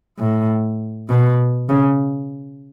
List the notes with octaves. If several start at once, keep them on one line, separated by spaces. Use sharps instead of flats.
A2
B2
C#3